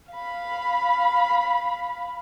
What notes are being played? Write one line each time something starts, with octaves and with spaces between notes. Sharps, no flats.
F5 B5